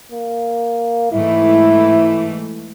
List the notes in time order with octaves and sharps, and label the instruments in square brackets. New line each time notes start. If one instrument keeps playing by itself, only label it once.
[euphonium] A#3
[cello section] G#2 E3 A3 [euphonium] E4